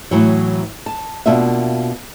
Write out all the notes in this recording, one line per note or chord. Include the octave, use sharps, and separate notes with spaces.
A2 E3 F#3
A5
B2 A#3 D4 F4 E5